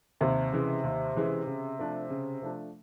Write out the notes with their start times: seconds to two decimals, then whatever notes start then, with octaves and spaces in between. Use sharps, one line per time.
0.21 D#2 C3
0.52 C#3 E3 G#3
0.84 D#2
1.15 C#3 E3 G#3
1.47 C#3
1.79 F3 A3 D4
2.10 C#3
2.42 F3 A3 D4